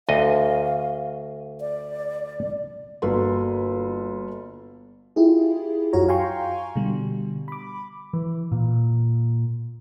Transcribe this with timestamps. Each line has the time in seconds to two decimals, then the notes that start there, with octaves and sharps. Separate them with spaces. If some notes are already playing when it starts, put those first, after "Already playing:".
0.09 D2 D#5 F5
1.61 D5
3.02 G1 A#3 F#4 A4 B4 C6
5.16 E4 F4 G4 G#4
5.93 F#2 F4 F#4 C#5 A#5
6.08 F5 G5 G#5 A#5 C6 C#6
6.75 B2 D3 G3
7.48 B5 D6
8.14 E3
8.52 A#2